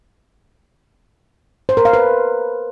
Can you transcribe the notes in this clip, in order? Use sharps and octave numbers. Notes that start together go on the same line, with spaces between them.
C5
A#4
F5
B4